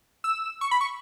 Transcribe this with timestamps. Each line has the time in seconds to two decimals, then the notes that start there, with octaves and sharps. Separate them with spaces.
0.24 E6
0.61 C#6
0.71 B5
0.81 C#6